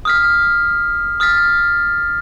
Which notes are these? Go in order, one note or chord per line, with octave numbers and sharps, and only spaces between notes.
D#6 F6 B6
D#6 F6 A6 B6